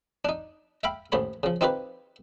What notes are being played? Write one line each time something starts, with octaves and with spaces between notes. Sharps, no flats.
D4 D#4
E5 F5 G5 B5
A1 D#2 C5 C#5 B5
C#3 F3
C4 D#4 F4 G4 B4 C5